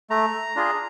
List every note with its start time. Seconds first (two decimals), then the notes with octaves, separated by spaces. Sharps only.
0.10 A3 A#5
0.56 D4 F4 G#4